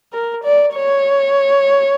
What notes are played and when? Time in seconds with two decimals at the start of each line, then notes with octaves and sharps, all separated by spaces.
0.13 A#4
0.44 D5
0.75 C#5